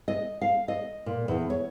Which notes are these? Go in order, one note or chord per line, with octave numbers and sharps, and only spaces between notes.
D#5
F5
D#5
A#2
E2
C#5